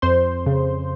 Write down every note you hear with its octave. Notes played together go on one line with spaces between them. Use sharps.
F2 C5 C6
C#3